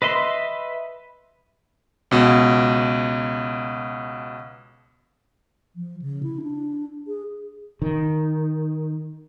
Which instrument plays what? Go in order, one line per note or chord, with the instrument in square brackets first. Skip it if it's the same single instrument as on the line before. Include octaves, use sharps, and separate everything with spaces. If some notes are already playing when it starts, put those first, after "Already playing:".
[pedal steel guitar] B4 D#5 E5 C6
[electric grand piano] C#2 B2
[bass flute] F3
C#3
E4
D4
G#4
[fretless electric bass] D#3